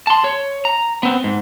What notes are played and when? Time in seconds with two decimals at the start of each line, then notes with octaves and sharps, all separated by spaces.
0.07 A5 C6
0.24 C#5
0.65 A#5
1.03 B3 C4
1.24 G#2